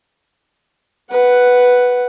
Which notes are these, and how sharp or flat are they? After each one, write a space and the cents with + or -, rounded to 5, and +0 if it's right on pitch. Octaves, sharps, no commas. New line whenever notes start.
B4 +0 F#5 +5